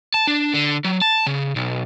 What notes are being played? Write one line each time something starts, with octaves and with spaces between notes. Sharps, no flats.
A5
D4
D3
F#3
A5
C#3
B1